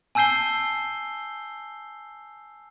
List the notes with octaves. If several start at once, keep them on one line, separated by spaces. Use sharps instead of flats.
G#5 A5 E6 G6 C7 G7